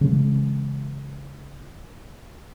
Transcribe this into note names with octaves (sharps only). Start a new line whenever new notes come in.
C#3 E3 G#3